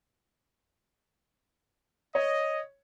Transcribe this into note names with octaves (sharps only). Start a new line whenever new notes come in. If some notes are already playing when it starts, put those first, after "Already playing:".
C#5 D#5